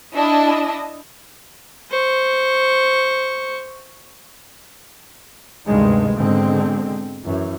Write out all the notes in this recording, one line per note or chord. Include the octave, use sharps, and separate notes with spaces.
D4 E4 D#5 A5
C5 C#6
D2 G2 C3 D#3 G#3
G#2 B2 D3 G#3 C4
F#2 E3